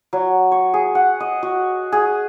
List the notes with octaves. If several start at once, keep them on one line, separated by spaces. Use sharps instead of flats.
F#3
C#5
G#4
F#5
D#5
F#4
G#4